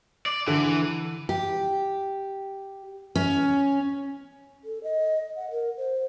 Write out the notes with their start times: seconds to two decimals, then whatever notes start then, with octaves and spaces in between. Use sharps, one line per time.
0.26 D5
0.48 D3 E3
1.29 G4
3.16 C#4
4.65 A4
4.84 D#5
5.37 F#5
5.51 A#4
5.77 C5